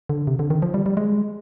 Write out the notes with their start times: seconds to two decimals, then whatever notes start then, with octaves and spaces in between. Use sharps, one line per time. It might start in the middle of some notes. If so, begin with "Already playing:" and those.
0.09 D3
0.27 C3
0.39 D3
0.50 D#3
0.62 F3
0.74 G3
0.86 G3
0.97 G#3